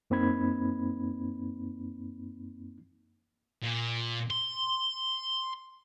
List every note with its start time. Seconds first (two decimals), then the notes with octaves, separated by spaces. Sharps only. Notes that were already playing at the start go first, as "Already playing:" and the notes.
0.10 F#2 A#3 C4 D#4 B5 G#6
3.62 A#2
4.31 C6